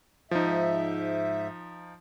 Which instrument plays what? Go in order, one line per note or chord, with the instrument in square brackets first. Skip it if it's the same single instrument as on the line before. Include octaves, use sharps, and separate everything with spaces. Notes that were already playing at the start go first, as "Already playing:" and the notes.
[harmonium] G#2 E5 [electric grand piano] F3 D#4